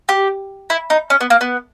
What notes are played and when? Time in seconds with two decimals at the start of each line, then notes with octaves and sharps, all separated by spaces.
0.09 G4
0.70 E4
0.90 D#4
1.10 C#4
1.21 B3
1.30 A#3
1.41 B3